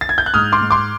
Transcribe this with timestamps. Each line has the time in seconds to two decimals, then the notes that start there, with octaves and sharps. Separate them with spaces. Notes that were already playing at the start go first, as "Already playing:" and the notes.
0.01 A6
0.09 G#6
0.18 G6
0.26 F#6
0.34 G#2 D#6 F6
0.52 C6 D6
0.61 G#2
0.71 C6 D6